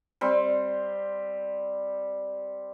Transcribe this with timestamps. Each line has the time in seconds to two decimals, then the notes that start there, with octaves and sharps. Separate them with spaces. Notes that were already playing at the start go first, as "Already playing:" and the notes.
0.21 G3 C4 C6